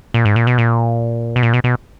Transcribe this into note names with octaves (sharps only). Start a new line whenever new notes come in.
A#2
G#2
A#2
B2
A#2
B2
A#2
B2
B2